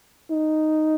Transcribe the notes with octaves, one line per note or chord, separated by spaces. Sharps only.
D#4